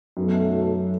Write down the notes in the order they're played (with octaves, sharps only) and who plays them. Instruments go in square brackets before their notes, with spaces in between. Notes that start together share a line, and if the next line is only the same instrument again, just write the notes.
[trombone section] B1 B2 A3 [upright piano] F#2